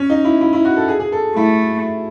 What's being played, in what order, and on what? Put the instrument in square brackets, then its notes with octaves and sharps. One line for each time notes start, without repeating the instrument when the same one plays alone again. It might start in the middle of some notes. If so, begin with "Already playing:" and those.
Already playing: [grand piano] C#4
D#4
E4
E4
E4
F#4
A4
G#4
G#4
A4
[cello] A3 [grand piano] E4